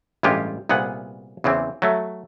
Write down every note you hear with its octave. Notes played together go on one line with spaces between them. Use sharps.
A1 G2 G3 G#3 F4 G4
C2 A#2 B3 G#4 F#5
E2 C#3 E3 C4
F#3 A3